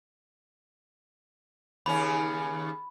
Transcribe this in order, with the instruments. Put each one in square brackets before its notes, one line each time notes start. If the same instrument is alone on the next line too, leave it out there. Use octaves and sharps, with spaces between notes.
[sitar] D#2 C#3 C#4 [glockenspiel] B5